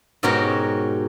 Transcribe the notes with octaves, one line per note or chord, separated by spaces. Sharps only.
G#2 B2 F#4 G4 A#4 C#5